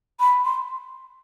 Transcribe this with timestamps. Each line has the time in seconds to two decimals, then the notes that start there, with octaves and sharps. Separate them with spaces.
0.20 B5
0.45 C6